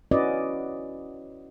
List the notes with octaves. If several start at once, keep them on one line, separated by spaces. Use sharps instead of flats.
C#4 E4 F#4 B4 D5 D#5